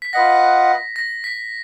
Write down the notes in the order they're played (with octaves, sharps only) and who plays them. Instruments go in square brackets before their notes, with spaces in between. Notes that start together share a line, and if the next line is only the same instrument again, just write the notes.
[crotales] B6
[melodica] F4 B4 D#5 F#5 [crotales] A#6
[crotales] A#6
B6